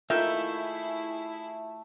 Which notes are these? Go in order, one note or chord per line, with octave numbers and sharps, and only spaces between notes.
D#3 A3 A#3 E4 F4 G#4 E5 G6